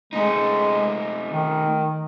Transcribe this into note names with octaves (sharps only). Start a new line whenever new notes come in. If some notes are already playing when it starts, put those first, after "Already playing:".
G#3 A3 D#4
D#3